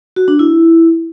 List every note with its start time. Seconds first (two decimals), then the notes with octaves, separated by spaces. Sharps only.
0.16 F#4
0.28 D4
0.39 E4